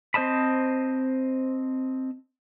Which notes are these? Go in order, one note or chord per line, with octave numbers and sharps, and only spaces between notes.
C4 C5 D#5 A5 B5